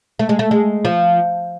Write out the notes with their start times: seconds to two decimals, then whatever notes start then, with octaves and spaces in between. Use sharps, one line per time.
0.19 A3
0.29 G#3
0.39 A3
0.51 G#3
0.85 F3